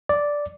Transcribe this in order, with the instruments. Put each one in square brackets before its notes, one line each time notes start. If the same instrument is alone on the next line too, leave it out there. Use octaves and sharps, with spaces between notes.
[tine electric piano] D5